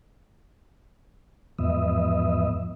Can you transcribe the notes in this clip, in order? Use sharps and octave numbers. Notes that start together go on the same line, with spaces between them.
E2 G#2 F3 B3 D#5 E5